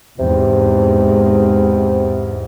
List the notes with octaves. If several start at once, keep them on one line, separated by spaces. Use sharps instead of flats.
E2 G#2 C3